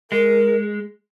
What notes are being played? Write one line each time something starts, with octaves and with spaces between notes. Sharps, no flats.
G#3 A#4